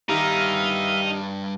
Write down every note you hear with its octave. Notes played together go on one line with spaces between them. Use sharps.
G2 D#3 D#4 G4 E5 F5 A#5 B5